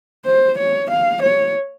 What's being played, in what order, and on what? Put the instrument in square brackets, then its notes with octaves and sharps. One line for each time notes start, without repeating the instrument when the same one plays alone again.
[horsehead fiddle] C5
C#5
F5
C#5